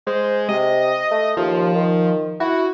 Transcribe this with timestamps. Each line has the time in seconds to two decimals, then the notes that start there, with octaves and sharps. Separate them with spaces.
0.07 G#3 C5
0.49 C3 D#5
1.11 A3
1.37 D#2 F3
1.75 D#3
2.40 E4 F#4